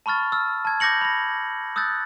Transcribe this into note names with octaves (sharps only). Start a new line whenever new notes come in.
A5 B5 C#6 F6 A6
E6 F6
A5 G#6
B5 D6 G6 A#6 C#7 F#7
B5 A#6
D#6 E6 F#6 G6 A6